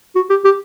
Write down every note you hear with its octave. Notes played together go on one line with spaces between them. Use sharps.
F#4
G4
G4